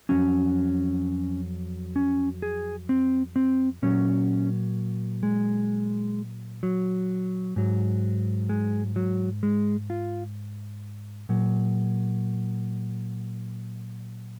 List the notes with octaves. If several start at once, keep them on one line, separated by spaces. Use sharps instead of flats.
F2 D#3 F#3 C#4
C#4
G#4
C4
C4
A#2 F#3 C#4
G#3
F#3
G#2 F#3
G#3
F#3
G#3
F4
A#2 F#3